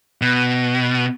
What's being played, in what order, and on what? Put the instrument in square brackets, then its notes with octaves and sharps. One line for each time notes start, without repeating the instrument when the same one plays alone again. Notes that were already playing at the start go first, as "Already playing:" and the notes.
[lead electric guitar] B2